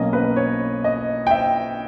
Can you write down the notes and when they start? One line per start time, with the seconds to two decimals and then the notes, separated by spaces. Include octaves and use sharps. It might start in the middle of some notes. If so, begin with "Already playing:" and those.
Already playing: B1 B2 A#3 C#4 D#5
0.13 B4
0.36 C#5
0.84 D#5
1.27 G5
1.31 E5